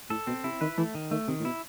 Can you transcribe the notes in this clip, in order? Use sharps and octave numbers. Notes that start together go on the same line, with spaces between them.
A2 A4
B2 C4
C3 E4
D#3 B4
E3 A3
D#3
D#3 A3
C3 D#3
A2
B2 E4